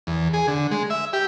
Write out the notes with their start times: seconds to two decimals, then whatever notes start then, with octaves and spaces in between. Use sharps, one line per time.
0.07 E2
0.34 G#4
0.48 D3
0.71 G#3
0.90 E5
1.13 G4